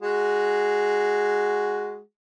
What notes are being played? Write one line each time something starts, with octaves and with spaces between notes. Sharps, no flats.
G#3 F#4 G#4